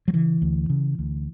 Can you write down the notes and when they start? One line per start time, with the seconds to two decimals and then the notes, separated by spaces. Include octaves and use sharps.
0.08 F#3
0.13 C#3 E3
0.42 D2
0.70 C#3
0.99 D2